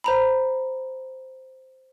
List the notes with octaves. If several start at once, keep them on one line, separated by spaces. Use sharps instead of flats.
C5 A#5 B5